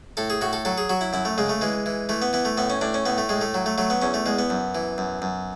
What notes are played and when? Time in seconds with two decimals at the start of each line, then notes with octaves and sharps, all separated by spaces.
0.17 A2 A4
0.30 G#4
0.41 A2 F#4
0.53 A4
0.65 F#3 A4
0.78 G#4
0.90 F#3 F#4
1.01 E4
1.13 F#2 E4
1.25 A3
1.38 C#3 G#3
1.49 A3
1.61 E3 G#3
1.86 E3
2.09 E3 A3
2.22 B3
2.33 E3 B3
2.45 A3
2.57 A2 B3
2.70 C#4
2.81 A2 D4
2.94 C#4
3.06 A2 B3
3.18 A3
3.29 A2 G#3
3.41 A3
3.54 F#3
3.66 A3
3.78 F#3 A3
3.90 B3
4.02 E2 C#4
4.14 A3
4.26 E2 G#3
4.39 B3
4.50 F#2
4.75 E3
4.98 F#2
5.22 F#2